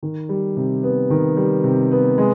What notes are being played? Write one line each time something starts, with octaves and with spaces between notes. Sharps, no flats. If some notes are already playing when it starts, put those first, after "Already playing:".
D#3
G3
C3
B3
D#3
G3
C3
B3
G#3